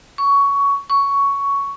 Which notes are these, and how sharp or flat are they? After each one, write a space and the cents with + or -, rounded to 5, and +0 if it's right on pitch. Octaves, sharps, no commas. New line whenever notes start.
C#6 +15
C#6 +10